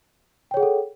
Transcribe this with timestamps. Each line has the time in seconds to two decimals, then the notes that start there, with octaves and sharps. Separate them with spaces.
0.51 G5
0.54 C#5
0.57 G#4
0.60 F#5
0.63 A4